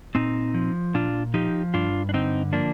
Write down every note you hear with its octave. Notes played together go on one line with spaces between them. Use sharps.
A#2 C4 D#4
F3
A#2 D4 F4
F3 D#4 G4
G2 D4 F4
D4
D3 C4 D#4
F3 A#3 D4